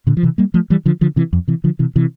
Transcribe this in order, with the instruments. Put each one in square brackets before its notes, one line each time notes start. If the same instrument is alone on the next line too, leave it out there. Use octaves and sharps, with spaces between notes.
[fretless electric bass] A#2 D3
F3
C3 E3
G3 A#3
F3 A3
E3 G3
D3 F3
D3 F3
C3 E3
F2
C3 E3
D3 F3
C3 E3
C3 E3